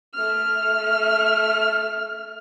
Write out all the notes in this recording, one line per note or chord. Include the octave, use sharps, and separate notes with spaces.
A3 F6